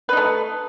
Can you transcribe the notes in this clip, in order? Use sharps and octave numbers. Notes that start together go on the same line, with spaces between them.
A3 D#4 B4